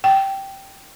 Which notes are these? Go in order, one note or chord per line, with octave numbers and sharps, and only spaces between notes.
G5